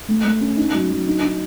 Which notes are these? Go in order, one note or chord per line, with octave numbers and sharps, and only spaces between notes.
A3
A3
C#4
D#4
F#3
F#3
D#4
D#4